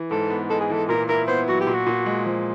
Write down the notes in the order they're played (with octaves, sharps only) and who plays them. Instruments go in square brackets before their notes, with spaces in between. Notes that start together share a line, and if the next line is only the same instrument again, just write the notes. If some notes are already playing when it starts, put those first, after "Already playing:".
Already playing: [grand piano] E3
[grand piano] G#2 [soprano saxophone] A4
[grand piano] B3
[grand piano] G#3 [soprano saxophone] A4
[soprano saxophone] G#4
[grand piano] E3 [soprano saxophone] A4
[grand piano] A#2 [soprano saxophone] A#4
[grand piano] E4 [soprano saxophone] A#4
[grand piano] B3 [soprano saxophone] C5
[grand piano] F#3 [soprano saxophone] F#4
[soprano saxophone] G4
[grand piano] A#2
[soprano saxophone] F#4
[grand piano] A#2
G#3
F3